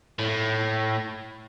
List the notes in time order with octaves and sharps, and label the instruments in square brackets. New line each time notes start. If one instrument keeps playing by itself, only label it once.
[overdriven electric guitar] A2